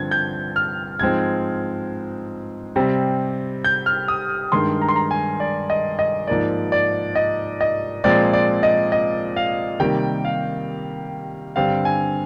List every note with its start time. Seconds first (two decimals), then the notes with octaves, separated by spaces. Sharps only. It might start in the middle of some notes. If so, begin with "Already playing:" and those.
Already playing: G2 D3 F3 C4 G#6
0.11 G6
0.56 F6
0.99 G#2 F3 G#3 C4 G#6
2.76 C3 G3 C4
3.65 G6
3.86 F6
4.08 D#6
4.52 G2 D#3 G#3 C6
4.81 A#5
4.89 C6
4.96 A#5
5.11 G#5
5.40 D5
5.70 D#5
5.99 D#5
6.27 G#2 F3 A#3 D5
6.72 D5
7.15 D#5
7.61 D#5
8.04 A#2 F3 G#3 C4 D5
8.33 D5
8.63 D#5
8.92 D#5
9.36 F5
9.80 C3 D#3 G3 A#3 G5
10.25 F5
11.56 G2 D3 G3 C4 F5
11.85 G#5